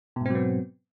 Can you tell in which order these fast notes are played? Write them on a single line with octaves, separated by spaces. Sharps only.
B2 G#2 C4 F#3 B3